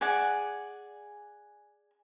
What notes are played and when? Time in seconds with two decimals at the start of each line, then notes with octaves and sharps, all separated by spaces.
0.01 G#4 D5 F#5 G#5